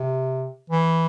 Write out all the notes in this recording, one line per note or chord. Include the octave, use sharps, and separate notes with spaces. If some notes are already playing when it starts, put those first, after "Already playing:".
Already playing: C3
E3